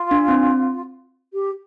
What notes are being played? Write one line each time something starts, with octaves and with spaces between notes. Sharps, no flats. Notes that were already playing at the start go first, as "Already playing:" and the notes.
Already playing: F4
D4
C4
G4